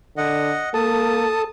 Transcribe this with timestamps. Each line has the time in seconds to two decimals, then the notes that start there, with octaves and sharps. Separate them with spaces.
0.17 D3 D#5 F#5
0.74 A#3 A4 A5 D#6